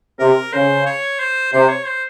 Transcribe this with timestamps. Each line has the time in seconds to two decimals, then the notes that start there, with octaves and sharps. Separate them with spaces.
0.19 C3 A#4
0.53 C#3 C5
0.86 C#5
1.19 C5
1.53 C3 C5
1.69 C#5
1.86 C5